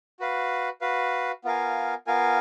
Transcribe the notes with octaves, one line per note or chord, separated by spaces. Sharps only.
F#4 B4 F5
F#4 B4 F5
B3 F4 A#4 F5 G#5
B3 F4 A#4 F5 G#5